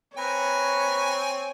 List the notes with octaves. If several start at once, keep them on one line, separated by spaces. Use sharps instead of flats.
C4 B4 C#5 G#5 A#5 C#6